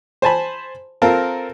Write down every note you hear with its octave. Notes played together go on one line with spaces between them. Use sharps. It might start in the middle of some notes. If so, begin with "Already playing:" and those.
C5 G#5 A5 B5
C4 F4 A4 A#4